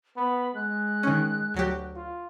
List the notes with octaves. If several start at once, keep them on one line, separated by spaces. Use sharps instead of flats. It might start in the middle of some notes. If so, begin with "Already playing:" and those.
B3 B5
G#3 F#6
D#3 C#4
D2 F#3 G4
F4